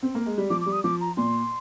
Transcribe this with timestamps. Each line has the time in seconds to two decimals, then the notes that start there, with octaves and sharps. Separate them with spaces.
0.03 C4
0.15 A#3
0.26 G#3
0.38 G3
0.50 F3 D6
0.61 D6
0.66 G3
0.72 D#6
0.84 F3 D6
1.01 A#5
1.17 A#2 C6